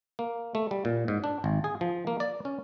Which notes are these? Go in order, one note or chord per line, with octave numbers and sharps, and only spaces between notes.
A#3
A3
G3
A#2
G#2
D4
G#1
G#4
F3
A#3
D5
C#4